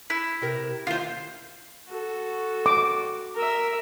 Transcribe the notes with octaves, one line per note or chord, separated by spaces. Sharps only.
E4
C3 G4 A#4
D#2 D#3 E4 F4 C5
F#4 A4
D6
A#4 E5